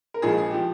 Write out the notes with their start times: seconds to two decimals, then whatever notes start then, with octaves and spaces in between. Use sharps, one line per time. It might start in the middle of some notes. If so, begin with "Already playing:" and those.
0.14 A#4
0.22 A#1 A#2 F3 G#3 G#4
0.38 G#4
0.51 F3 G4